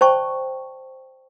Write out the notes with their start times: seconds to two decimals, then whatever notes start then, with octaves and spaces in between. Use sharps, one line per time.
0.01 C5 D5 G5 A5 C#6